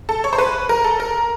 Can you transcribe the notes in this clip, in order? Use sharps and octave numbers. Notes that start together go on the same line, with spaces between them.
A4
C#5
C5
B4
A#4
A4
A#4